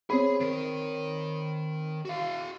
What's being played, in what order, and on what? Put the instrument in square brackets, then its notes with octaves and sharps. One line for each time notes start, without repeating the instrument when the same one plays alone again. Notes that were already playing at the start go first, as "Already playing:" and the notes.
[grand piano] C4 C#5 B5 [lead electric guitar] G#4
[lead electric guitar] D#3 A#4
F#4 F5